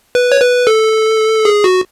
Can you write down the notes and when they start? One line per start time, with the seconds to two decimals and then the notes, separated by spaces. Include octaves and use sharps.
0.15 B4
0.32 C#5
0.41 B4
0.67 A4
1.45 G#4
1.64 F#4